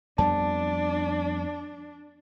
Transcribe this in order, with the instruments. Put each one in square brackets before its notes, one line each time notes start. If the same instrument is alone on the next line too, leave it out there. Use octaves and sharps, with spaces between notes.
[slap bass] F2 G3 B3 [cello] D4 [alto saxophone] D5 [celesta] A5